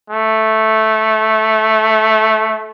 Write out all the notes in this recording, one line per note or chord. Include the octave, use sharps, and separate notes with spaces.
A3